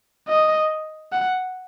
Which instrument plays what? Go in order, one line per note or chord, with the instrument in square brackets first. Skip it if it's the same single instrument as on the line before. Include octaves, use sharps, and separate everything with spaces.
[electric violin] D#5
F#5